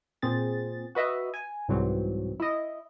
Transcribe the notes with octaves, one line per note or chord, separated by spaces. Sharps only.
A#2 C4 G#4 A6
F#4 B4 D#5 E5
G#5
C2 G#2 C3 E3 F#3 C4
E4 D#5